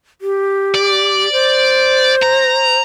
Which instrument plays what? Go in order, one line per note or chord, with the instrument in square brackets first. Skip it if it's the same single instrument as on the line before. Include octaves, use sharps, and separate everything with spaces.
[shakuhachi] G4
[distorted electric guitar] D5
[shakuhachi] C5
[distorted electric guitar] A#5